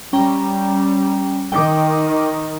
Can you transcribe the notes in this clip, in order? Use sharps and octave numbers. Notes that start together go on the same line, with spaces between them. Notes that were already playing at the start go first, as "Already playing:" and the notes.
G3 C#4 G5 A#5
D#3 G5 D6